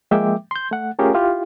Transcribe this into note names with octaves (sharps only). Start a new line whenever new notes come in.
F3 G#3 A#3 E5 G5 D6
C6 G6
A3 F#5
A3 C#4 F4 G4 G#4 A#4
E4 F4 G4